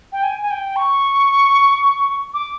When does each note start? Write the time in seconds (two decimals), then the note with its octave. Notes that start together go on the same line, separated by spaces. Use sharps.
0.12 G5
0.23 G#5
0.41 G#5
0.51 G5
0.76 C#6
2.34 D6